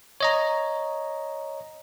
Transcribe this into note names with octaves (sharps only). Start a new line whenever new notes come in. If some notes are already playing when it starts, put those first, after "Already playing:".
C#5 D#5 A#5